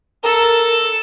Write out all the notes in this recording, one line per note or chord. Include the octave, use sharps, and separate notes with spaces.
A4 A#4